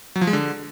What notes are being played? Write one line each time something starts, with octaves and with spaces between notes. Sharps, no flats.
F#3
F3
G#3
D3